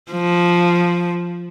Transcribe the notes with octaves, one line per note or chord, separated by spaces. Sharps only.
F3